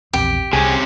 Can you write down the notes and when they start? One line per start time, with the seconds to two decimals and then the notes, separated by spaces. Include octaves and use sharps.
0.13 A#1 E2 C4 G4
0.53 C2 C3 C4 C#4 G#4